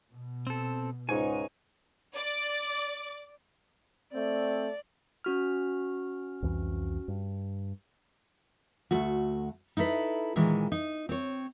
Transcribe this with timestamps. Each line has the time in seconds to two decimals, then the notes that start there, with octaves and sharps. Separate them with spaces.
0.12 B2
0.47 C4 A4
1.09 C#2 G#2 D#4 C#5 G#5
2.15 D5 D6
4.14 A3 C4 D5
5.24 C#4 F#4 F6
6.42 C2 F2 E3
7.08 G2
8.91 D2 A3 F#4
9.77 D#4 E4 A4 B4
10.36 A#2 D#3 E3 G#3
10.72 D#4
11.09 C4 C#5